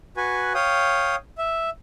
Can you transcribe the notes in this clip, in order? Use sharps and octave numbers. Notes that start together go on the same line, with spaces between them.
F#4 B4 G#5
C#5 F5 G5 D#6
E5